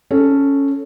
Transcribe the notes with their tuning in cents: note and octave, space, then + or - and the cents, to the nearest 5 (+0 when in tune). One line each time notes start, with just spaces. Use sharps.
C#4 +0 A4 +0